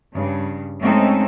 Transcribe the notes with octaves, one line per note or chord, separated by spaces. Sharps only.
G2 C#3
G#3 A3 C4 C#4 D#4 A4